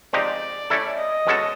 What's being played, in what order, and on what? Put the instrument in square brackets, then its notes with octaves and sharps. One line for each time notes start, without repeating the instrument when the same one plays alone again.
[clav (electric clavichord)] F3 G#3 C4 D#4 G4 [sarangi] D5
[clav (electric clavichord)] A3 C#4 E4 A4
[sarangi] D#5
[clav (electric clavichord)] B2 G#3 C#4 F#4 A4